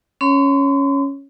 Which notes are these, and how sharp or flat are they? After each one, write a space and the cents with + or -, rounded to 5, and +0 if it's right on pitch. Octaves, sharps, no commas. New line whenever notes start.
C#4 +0 C#5 +0 C6 -40